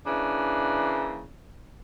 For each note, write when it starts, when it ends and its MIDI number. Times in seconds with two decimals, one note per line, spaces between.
0.07 1.27 49
0.07 1.27 52
0.07 1.27 58
0.07 1.27 62